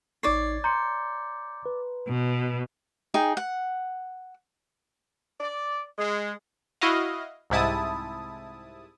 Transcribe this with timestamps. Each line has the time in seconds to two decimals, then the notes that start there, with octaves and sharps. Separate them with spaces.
0.23 A1 D#4 C#5 D5 C7
0.64 A#5 C6 G6 C#7
1.66 B4
2.08 B2
3.14 D#4 G#4 G5
3.37 F#5
5.40 D5
5.98 G#3
6.81 E4 F#4 D#5 F5
7.50 C2 G#2 C3 E4 A5 D#6